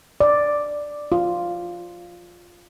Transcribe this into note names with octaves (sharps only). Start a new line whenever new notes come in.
D5
F4